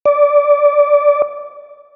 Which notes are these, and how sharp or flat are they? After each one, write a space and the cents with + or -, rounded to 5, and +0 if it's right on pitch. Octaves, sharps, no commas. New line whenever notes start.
D5 -15